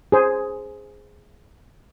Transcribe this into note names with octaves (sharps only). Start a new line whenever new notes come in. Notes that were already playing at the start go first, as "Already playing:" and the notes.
G#4 C5